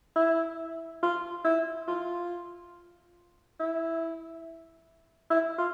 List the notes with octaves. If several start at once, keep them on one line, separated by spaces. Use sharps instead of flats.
E4
F4
E4
F4
E4
E4
F4